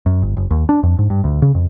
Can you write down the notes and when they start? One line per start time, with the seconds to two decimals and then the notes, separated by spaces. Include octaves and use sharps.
0.06 F#2
0.22 G1
0.37 F#1
0.51 D#2
0.69 D4
0.83 F2
0.99 G#2
1.10 G2
1.24 D2
1.42 C#3
1.55 F2